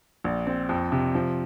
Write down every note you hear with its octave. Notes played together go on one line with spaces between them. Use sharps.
A#1
C4
F2
C3
F3